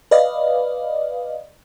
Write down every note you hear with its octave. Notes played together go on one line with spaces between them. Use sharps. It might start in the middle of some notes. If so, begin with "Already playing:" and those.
B4 D5 D#5 F5